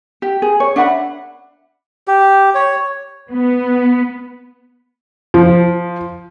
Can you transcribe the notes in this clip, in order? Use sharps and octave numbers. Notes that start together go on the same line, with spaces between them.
G4
G#4
C#5
D4 E5 F#5 B5
G4
C#5
B3
F3